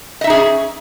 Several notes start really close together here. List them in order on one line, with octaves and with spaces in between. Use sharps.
D#5 E5 D#4 G#4 C#4